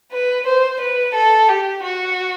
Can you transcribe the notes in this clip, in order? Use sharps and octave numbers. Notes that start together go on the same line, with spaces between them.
B4
C5
B4
A4
G4
F#4